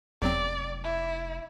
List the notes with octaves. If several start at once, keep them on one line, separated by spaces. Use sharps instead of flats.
F1 E2 F#3 C4 D5
E4